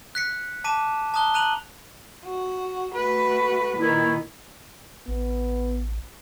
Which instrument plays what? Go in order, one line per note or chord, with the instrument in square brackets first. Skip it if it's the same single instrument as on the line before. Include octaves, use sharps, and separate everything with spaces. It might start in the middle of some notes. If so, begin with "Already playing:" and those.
[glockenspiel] F#6 B6 C#7
A5 D6 B6 D#7 E7
A5 A#5 D#6 F#6 G7
A#5 F#6 D#7 F7 F#7
[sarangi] F#4
[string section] A3 F#4 [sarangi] B4
[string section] A#2 D#3 [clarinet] E4
[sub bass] A1 [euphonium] B3